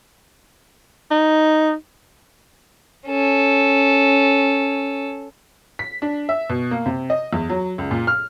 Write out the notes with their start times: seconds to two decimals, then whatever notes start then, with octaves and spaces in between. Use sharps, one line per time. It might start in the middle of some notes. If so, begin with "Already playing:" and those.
1.11 D#4
3.07 C#4 A4
5.79 B6
6.02 D4
6.29 E5
6.49 B2
6.71 A#3
6.86 C3
7.10 D#5
7.33 E2
7.49 F#3
7.78 C#2
7.91 A#2
8.07 F6